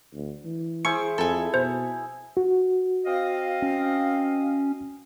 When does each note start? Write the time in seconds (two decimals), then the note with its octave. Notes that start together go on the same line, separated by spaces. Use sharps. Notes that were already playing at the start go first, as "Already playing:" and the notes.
0.14 D2
0.44 E3
0.85 E4 G#4 C5 C#6 C#7
1.18 F2 A4 G#5 B5
1.54 B2 C5
2.37 F#4
3.06 C4 D#5 F5
3.62 C#4